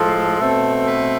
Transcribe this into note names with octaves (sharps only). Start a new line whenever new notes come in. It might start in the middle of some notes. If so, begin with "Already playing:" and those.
Already playing: A2 F3 G#3 A4
B2 A3 C4
B4